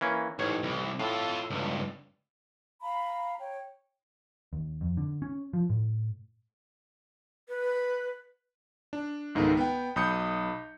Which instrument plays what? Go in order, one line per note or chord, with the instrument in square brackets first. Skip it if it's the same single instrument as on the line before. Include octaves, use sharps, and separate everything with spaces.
[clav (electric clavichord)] E3 A#3 C#4
[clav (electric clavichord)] A1 C#5 [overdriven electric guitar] G#2
[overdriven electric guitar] C2
[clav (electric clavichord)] A2 [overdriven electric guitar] F4 A4
[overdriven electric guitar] C#2 G2
[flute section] F5 A#5 B5
C#5 G5
[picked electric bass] D#2
F2
D3
C#4
F3
A2
[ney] B4
[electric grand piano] D4
C#2 G#2 D#3 A3 B3
B3 G5
B1 B5 D#6 G6 C#7